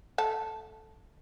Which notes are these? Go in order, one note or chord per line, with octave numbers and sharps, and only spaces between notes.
A3 A4